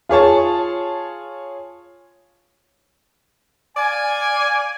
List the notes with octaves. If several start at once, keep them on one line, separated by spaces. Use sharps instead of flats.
F4 G#4 C#5 A5
D5 F5 G#5